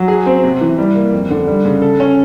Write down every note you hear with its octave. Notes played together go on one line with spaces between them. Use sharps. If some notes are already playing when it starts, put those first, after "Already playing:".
Already playing: F#3
G#4
C4
C3
E3
G3
A#3
F2
D3
G3
C#3
A4
C#4